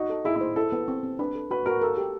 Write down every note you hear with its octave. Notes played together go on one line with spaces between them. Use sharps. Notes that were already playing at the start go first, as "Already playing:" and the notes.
Already playing: D#4 F#4
A4
E4 G#4
E4
C5
E4 A4
B3
C4
C4
D4 B4
A4
F#4 B4
F#4 A#4
A4 A#4
G4